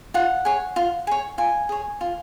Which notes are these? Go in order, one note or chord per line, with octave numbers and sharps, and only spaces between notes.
F4 F#5
G#4 C#5
F4
G#4 C#5
F4 G#5
G#4 C#5
F4